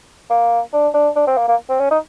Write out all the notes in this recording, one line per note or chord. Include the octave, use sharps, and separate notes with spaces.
A#3
D4
D4
D4
C4
A#3
A#3
C4
C#4
D#4